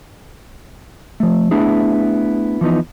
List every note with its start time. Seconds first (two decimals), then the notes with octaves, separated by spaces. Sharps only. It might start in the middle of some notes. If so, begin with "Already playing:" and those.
1.20 F3 A3
1.51 A3 B3 D4 E4 G#4
2.61 E3 F3 B3 D#4